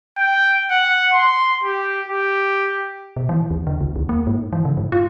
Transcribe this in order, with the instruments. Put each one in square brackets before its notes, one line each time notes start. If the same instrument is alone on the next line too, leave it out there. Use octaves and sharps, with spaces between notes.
[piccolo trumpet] G5
F#5
C6
G4
G4
[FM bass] B2
E3
D#2
D3
C#2
D#2
A#3
G#2
E3
C#3
G#2
F4